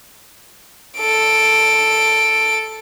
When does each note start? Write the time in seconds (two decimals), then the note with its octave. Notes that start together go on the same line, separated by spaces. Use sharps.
0.98 A4 D7